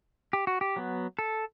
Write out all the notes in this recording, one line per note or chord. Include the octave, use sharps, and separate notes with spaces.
G4
F#4
G4
F#3 B3
A4